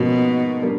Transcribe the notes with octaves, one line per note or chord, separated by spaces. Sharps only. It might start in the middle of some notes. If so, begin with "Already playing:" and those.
Already playing: G#2 B2 F3 A#3 C#4 F#4
G3 A#3 D4